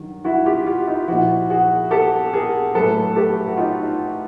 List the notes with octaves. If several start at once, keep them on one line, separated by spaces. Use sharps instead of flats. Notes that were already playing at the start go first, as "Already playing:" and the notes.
Already playing: G2 D#3 F#3
E4 F#4
F4 G4
F4 G4
D#4 F4
A#2 F3 E4 F#4
F#4 G#4
G4 A4
G#4 A#4
A2 F#3 A4 B4
G4 A4
F#4
D#4 F4